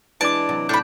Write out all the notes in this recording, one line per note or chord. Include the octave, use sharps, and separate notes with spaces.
E3 G#3 D4 D5 A5 D6 D7
C3 F#3
A2 D4 B5 G6